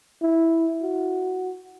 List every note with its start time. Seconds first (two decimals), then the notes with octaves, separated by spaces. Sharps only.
0.22 E4
0.82 F#4